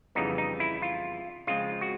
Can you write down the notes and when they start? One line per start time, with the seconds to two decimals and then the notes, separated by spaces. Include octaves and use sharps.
0.15 F2 C#3 E3 G3 B3 D#4
0.38 D#4
0.60 E4
0.82 F4
1.47 C#3 F3 G#3 C4 F4
1.81 F#4